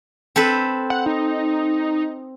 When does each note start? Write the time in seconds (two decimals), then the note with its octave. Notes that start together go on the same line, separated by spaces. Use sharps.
0.36 C4 A4 B4
0.90 F#5
1.06 D#4